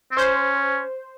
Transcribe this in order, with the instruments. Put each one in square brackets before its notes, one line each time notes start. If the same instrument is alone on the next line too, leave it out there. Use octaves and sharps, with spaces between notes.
[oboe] C4
[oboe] C#4 [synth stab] C5